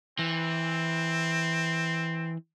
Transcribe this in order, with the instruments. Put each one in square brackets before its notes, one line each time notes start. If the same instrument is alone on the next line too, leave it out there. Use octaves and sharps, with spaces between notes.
[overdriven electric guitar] E3 [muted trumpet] C4